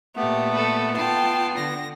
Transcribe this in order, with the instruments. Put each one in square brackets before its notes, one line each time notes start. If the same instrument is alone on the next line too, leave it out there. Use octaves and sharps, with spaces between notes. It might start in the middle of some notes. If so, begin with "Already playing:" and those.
[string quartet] A#2 A3 [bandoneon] B3 [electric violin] G4
[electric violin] A4 B4
[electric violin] F4 C7 [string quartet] G5 A5
[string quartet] D3 A#6